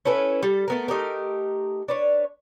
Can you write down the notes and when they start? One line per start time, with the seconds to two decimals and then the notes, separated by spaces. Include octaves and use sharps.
0.05 C#4 E4 A4 B4
0.43 G3 A4
0.68 A3 B3 A#4
0.88 A3 D#4 G4 A#4
1.88 D4 B4 C#5